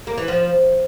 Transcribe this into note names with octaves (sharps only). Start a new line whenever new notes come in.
A#3
E3
F3